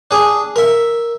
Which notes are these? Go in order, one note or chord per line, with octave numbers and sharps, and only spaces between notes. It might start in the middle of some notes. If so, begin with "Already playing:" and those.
D4 G#4
A#4 E5